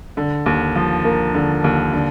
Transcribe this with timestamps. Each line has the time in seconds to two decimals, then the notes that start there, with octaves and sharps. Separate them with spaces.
0.17 D3
0.46 D#2
0.76 F3
1.05 A#3
1.34 D3
1.64 D#2
1.93 D3